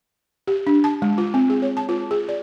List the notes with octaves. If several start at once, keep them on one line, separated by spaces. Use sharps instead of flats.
G4
D4
A5
G#3
F4
C4
G#4
C#5
A5
F4
G#4
D5